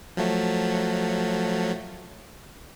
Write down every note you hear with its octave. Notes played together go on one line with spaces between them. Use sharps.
F3 F#3 A3